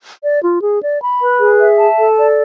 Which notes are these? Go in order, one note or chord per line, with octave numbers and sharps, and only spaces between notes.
D5
F4
G#4
D5
B5
B4
G#4
E5
A5
A4
D5